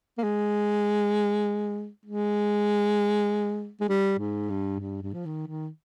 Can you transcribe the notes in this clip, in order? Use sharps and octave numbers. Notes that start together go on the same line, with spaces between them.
A#3
G#3
G#3
G#3
G3
G#2
G2
G2
G2
F3
D#3
D#3